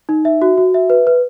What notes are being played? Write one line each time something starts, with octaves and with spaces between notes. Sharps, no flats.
D#4
E5
F#4
F#4
E5
B4
B4